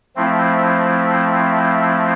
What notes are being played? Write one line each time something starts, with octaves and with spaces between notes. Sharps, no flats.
F3 A3 C4 E4